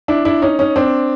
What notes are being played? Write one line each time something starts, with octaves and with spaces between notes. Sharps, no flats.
D4 E4
D4 E4
C#4 D#4
C#4 D#4
C4 D4